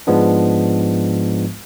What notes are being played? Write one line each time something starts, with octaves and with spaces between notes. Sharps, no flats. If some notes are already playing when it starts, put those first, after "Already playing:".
G#2 F3 G#3 B3 D4